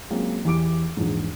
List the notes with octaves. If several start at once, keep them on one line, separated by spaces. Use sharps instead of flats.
F#3 G#3 A#3 C4 C#4 F4
E2 E3 G4 D6 D7
A#1 E2 G#2